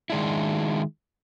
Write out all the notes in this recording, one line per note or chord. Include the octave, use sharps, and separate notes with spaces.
D#3 G#3 D4 E4